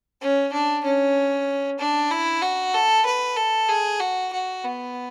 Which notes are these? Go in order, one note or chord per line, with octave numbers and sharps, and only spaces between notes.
C#4
D4
C#4
D4
E4
F#4
A4
B4
A4
G#4
F#4
F#4
B3